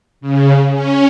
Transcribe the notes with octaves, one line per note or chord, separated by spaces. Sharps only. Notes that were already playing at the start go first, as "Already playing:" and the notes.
C#3
C#4